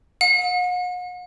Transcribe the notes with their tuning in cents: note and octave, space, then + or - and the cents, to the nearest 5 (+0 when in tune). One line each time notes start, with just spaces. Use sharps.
F#5 -45